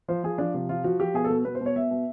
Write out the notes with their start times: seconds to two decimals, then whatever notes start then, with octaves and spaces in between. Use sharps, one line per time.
0.08 F3 C5
0.24 F3 G#4
0.38 F3 D4
0.54 C3
0.69 F3 F4
0.84 F3 F#4
1.00 F3 G4
1.14 B2 G#4
1.24 A4
1.30 B2
1.45 B2 B4
1.55 C5
1.61 B2
1.66 C#5
1.76 B2 E5
1.91 B2